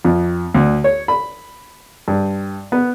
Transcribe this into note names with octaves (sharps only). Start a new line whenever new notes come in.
F2
D2
C#5
B5
G2
B3